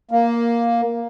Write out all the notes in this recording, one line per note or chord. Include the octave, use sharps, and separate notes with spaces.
A#3